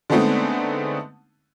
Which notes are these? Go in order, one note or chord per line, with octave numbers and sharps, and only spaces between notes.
D3 G#3 A3 B3 C4 D#4